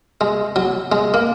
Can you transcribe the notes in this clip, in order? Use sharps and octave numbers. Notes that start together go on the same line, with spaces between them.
G#3
F#3
G#3
A#3